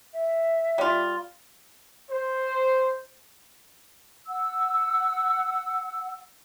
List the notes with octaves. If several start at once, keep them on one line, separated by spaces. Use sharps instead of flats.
E5
G3 F4
C5
F#5 E6